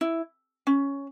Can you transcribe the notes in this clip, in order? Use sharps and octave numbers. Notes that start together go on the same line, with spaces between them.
E4
C#4